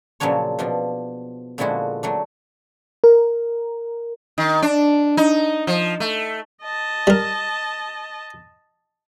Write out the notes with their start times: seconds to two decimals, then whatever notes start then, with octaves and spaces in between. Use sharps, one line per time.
0.20 A#2 C#3 F3 F#3 D4 C#5
0.59 B2 F3 D4
1.58 A#2 D3 F3 G#3 E4 F#4
2.03 F#3 A3 D4
3.04 A#4
4.38 D#3
4.62 D4
5.17 D#4
5.67 F3
6.00 A3
6.63 D#5 A5
7.07 G3 A#4